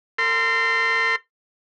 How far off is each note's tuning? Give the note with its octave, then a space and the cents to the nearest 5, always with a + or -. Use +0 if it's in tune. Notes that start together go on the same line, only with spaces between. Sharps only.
A#4 -45 C6 -15